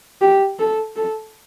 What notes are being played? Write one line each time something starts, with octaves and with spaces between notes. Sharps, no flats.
G4
A4
A4